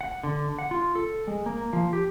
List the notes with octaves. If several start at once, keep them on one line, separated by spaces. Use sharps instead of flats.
F#5
D3
F#5
F4
A4
G#3
A#3
F3
G4